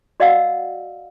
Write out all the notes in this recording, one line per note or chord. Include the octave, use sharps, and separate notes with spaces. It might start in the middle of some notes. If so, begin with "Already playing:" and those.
F#4 D5 D#5 F5 F#5 E6